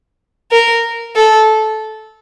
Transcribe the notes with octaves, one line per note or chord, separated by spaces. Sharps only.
A#4
A4